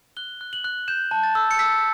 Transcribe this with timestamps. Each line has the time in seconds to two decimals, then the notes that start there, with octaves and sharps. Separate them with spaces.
0.17 F#6 G7
0.41 F#6
0.53 F#7
0.64 F#6
0.88 G6 E7
1.11 A5
1.23 A6
1.35 E6
1.51 C#7
1.59 E6 B6